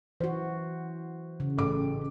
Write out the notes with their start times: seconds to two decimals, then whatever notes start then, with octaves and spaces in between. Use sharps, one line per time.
0.20 E3 F#4 C5
1.40 C#3
1.57 A1 A4 D6